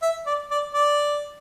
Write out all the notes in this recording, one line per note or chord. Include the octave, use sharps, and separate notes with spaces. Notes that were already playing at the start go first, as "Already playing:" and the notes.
E5
D5
D5
D5